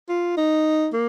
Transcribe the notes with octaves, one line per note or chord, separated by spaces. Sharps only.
F4
D#4
A#3